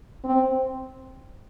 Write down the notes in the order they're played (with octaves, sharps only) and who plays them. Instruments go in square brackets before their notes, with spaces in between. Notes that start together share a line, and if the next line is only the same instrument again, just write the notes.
[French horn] C4